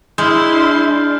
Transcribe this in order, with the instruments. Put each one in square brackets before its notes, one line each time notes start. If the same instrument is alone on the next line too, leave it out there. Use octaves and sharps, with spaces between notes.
[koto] G#3 [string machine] D4 [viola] E4 C6 [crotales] F6 G6